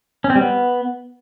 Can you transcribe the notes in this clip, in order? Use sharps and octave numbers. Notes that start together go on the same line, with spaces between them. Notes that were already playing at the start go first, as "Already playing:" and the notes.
C#4
C4
G3
B3